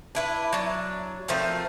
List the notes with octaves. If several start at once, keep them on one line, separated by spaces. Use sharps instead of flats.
D4 E4 B4
F#3 D4
F3 A3 C4 A#4